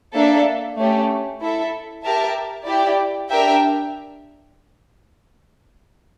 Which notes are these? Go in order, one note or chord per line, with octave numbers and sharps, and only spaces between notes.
A#3 D4 A4 E5
A3 C#4 G4
E4 A4 E5
G4 A#4 E5 A5
E4 G4 D5
D4 G4 A#4 E5 G5